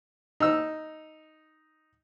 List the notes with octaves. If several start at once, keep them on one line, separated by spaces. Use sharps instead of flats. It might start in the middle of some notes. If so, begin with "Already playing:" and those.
D#4 E6